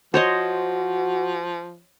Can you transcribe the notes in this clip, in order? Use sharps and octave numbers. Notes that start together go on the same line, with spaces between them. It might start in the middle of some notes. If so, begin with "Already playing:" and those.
F3 F#4 C5 C#5 D#5